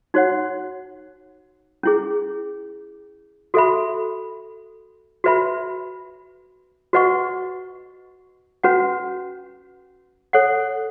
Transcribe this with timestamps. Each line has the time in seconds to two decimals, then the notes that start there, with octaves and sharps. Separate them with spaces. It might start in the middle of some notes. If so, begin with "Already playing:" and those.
0.14 D#4 F#4 C#5 F#5
1.83 C#4 E4 G#4
3.54 F#4 A4 E5 B5
5.24 F#4 B4 E5 B5
6.93 F#4 B4 D#5 F#5 C#6
8.64 C#4 F#4 B4 F#5
10.33 A4 C#5 F#5